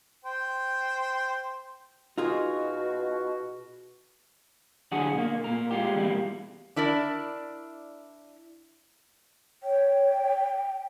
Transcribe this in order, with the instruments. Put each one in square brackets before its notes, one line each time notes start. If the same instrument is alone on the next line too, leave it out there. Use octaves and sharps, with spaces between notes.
[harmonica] C5 G5
[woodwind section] B2 F#4 [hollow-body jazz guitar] D#4 F4 G#4
[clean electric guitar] D3 F#3 F#4 G#4
B2 A#3
A#2 A#4
G#3 F4 G4
E2 B2 F3 G3 A#3
[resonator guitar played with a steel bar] D4 E4 A#4 D5
[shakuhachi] C#5 [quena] G5